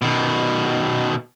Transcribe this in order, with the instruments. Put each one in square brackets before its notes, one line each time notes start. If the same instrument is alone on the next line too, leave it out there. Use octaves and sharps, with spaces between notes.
[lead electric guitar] B2 D#3